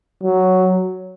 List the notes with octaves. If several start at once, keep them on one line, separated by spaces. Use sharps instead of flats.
F#3